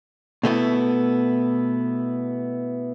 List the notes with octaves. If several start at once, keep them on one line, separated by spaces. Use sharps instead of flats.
B2 A3 B3 E4